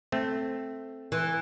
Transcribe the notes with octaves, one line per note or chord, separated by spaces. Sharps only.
A3 C4
E3